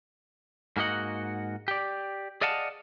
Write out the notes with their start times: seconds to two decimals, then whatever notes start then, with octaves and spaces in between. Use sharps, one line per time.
0.77 G#2 A#3 F#4 D#5 F#5
1.68 G4 D5
2.41 G#4 D5 D#5 F5 F#5 A5